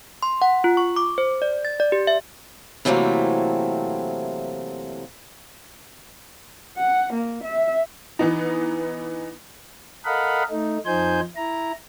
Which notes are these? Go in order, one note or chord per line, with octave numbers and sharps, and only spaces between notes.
C6
F#5
F4
C#6
D6
C5
D5
A6
D5
G4
E5
C3 E3 F#3 A3 A#3 C4
F#5
A#3
E5
E3 B3 D#4
A4 A#4 D#5 F5 F#5 B5
A3 D#4
F2 F3 D#4 C5 G#5 G6
E4 A#5